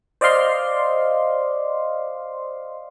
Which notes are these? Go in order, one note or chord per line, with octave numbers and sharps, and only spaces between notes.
C5 D5 D#5 F5 C6